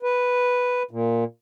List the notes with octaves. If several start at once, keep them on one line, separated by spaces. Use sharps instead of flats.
B4
A#2